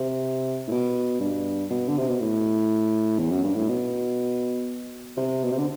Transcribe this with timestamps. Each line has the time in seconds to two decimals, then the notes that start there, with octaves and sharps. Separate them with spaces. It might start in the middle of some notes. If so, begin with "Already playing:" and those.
Already playing: C3
0.68 A2
0.71 B2
1.20 G2
1.70 B2
1.88 D3
1.98 C3
2.09 B2
2.20 A2
3.19 E2
3.31 F#2
3.44 G2
3.56 A2
3.68 B2
5.17 C3
5.44 B2
5.52 C3
5.58 D3